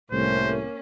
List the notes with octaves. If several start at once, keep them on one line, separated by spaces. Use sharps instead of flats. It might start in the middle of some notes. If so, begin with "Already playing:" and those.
C2 A2 A#3 C#4 C5